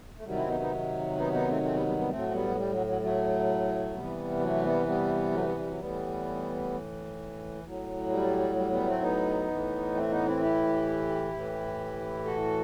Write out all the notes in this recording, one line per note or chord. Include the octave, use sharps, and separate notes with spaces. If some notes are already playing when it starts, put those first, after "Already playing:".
A3
C3 D#3 F#3 G3
C4 E4
B3 D#4
B3 D#4
B3 D#4
B3 D#4
A3 C4
A3 C4
G3 B3
G3 B3
G3 B3
A2 A3 C4
F#3
C4
G3 B3
F#3
G3
F#3
F#3
F#3 A3
C3 E3 G3 B3
F#3 A3
G3 B3
G3 B3
F#3 A3
G3 B3
G3
F#3
A2 E3 G3 B3
A2 F#3
G3
G3
G3 B3
A3 C4
B3 D#4
A2 E3
A3 C4
B3 D#4
C4 E4
E4 G4
A2 E3
F#4 A4